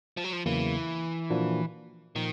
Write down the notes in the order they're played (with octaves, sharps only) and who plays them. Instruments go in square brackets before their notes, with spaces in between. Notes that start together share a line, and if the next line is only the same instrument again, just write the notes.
[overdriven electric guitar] F3
F#3
F3
[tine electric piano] E2 C#3 F#3 A#3 [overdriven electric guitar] E3
[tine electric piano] A#2 F3 A#3 D4 F#4
[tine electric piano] A#2 F3 [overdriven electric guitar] D#3